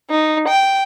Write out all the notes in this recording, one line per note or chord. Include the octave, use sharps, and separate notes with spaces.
D#4
G5